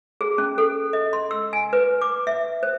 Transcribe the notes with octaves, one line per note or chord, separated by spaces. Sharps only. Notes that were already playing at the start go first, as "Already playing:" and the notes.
G#4
C#4
A4
D#5
C6
E6
G#5
B4
D6
E5
C5